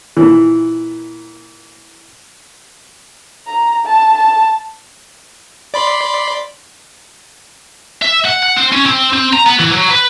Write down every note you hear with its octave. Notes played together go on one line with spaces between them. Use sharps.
A#2 E3
A#5
A5
A5
D5 B5 C6
E5
F#5
F#5
C4
C#4
C4
C4
A#5
B3
E3
F#3
B4